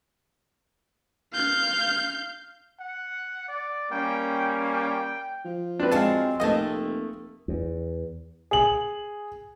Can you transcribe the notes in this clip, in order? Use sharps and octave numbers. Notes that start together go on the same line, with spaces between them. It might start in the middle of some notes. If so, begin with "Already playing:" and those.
F5 G6
F#5
D5
G3 A#3 C#4 G5
G5
F3
C4 D4 B4
F#3 G#3 G4 F5 A5
F1 A3 A#3 C4 D#5 A5
E2
G#4 F#7